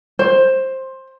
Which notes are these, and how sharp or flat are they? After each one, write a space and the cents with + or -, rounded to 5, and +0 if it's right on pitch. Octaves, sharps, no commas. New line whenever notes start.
C5 +15